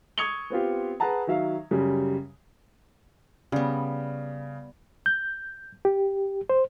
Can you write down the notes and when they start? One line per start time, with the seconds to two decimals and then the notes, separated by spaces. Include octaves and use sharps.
0.18 C#6 D#6 G#6 C#7 F7 G7
0.50 B3 C4 F4 G4
1.00 G#4 B4 F#5 A5 A#5
1.27 D#3 F#3 E5 F5
1.71 F#2 C#3 G3
3.52 C#3 G3 B3
5.06 G6
5.85 G4
6.50 C5